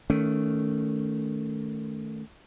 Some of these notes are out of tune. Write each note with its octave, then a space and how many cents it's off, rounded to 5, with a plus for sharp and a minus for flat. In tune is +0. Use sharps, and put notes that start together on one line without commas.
D#3 +5 A3 +0 C#4 +25